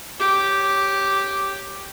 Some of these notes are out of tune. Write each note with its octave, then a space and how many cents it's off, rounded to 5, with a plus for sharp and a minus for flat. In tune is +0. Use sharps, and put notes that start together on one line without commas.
G4 -5 C#5 +0